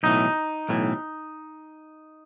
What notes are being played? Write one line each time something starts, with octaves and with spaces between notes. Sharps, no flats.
B1 A2 E3 D#4
B1 A2 E3